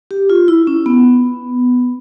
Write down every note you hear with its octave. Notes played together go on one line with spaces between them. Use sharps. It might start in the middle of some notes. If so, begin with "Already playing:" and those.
G4
F4
E4
C#4
B3